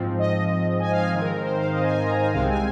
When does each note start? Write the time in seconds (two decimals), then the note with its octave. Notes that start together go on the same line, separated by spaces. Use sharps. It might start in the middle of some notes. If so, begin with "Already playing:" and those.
Already playing: G#2 F3 C4
0.19 D#5
0.80 G#5
0.91 F5
1.01 G#5
1.11 G#2 D#3 C4 G#4
1.21 A#4
1.31 A#4
1.42 C5
1.57 F5
1.72 D#5
1.83 G#5
1.93 G#5
2.03 A#5
2.19 G#5
2.34 C2 C3 G#3 C4 F5
2.50 G#5